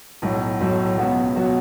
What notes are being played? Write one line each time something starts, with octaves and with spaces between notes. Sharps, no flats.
B1 A2 F#3
B1 A2 F#3
C#2 B2 F#3 B3 F#4
B2 F#3 B3 F#4